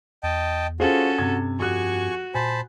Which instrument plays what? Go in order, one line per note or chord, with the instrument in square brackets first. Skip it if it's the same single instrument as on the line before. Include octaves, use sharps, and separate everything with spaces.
[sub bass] E2 [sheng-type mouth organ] D#5 G5 A5
[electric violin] C#4 A4 [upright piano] F4 G#4 C5 [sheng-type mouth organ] F#4
[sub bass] G2 [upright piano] C3 G#6
[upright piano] F2 G4 F#6 [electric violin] F#4 [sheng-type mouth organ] G#5 C#6
[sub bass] A#2 [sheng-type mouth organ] C5 A5 B5 [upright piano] G#5